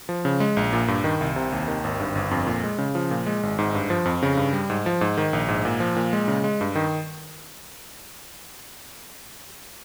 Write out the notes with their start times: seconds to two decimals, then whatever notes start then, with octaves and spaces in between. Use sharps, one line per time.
0.09 F3
0.25 C#3
0.40 G#3
0.57 A#1
0.73 A#2
0.88 G2
1.04 D#3
1.21 C2
1.36 C3
1.52 D#2
1.68 D#3
1.84 G#1
1.99 G2
2.15 G1
2.31 F2
2.47 A#2
2.64 G#3
2.78 C#3
2.95 F3
3.11 A#2
3.26 G#3
3.43 G#1
3.59 G#2
3.75 G2
3.90 F3
4.05 F2
4.23 C#3
4.37 G2
4.53 G3
4.70 G#2
4.86 F3
5.01 G#2
5.18 D#3
5.33 A#1
5.48 G#2
5.65 A#2
5.80 F3
5.96 A#2
6.13 G#3
6.28 C#3
6.44 G#3
6.61 G2
6.75 D#3